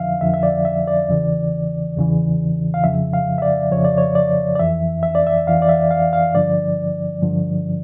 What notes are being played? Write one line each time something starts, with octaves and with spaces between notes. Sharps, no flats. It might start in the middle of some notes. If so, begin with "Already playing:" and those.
Already playing: F2 D3 F3 E5 F5
F2 D3 F3 E5
E5
D5
E5
D5
E2 C#3 E3
E2 C#3 E3
F5
F2 C#3 F3 E5
F5
E5
D5
F2 C#3 F3 C#5
D5
C#5
D5
D5
F2 E3 E5
E5
D5
E5
F2 E3 F5
D5
E5
F5
F5
G2 D3 F3 D5
G2 D3 F3